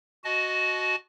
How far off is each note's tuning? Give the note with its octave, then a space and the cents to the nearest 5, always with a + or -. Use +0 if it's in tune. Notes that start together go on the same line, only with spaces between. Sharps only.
F#4 +0 D#5 +0 A5 -35